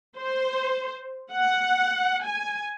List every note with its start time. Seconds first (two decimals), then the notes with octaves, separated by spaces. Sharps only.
0.16 C5
1.31 F#5
2.23 G#5